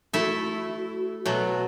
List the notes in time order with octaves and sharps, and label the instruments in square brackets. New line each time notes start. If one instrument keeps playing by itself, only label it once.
[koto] A3 E4 A4 E5 [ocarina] F#4
[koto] B2 F#3 A3